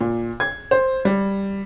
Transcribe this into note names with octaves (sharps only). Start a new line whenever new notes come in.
A#2
G#6
C5
G3